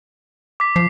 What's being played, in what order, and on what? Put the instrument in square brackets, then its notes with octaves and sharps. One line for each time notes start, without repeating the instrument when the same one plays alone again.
[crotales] D6 B6
[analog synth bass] F3 [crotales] C7